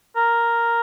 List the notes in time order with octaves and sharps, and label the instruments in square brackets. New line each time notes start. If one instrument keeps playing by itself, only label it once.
[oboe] A#4